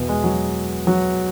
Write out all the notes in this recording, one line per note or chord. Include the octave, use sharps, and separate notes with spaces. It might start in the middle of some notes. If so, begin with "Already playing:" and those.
Already playing: E2 B2
G#3
F#3
F#3